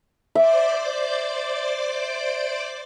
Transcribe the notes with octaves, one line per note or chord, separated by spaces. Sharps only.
C5 D5 E5 D6